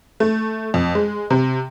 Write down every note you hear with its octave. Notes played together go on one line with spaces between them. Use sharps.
A3
F2
G#3
C3